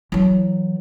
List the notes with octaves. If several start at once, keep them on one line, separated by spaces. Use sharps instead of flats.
E3 F#3